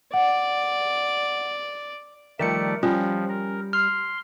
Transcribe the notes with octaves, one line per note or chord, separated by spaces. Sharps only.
D5 F#5
D#3 F3 G3 A3 A#4 D5 C#7
F3 G3 C#4 F4
A#4
C6 F6